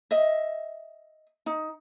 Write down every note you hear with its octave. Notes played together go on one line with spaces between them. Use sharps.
D#5 E5
D#4